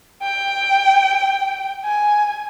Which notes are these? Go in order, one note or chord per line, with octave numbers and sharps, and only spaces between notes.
G5
G#5